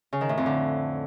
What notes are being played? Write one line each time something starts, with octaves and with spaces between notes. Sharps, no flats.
C#3
D#3
A2
F2
D3